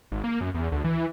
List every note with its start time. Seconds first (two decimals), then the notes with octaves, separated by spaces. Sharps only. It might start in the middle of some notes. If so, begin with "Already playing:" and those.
0.12 G#1
0.24 A#3
0.41 F#2
0.54 E2
0.72 D2
0.84 E3
0.97 E3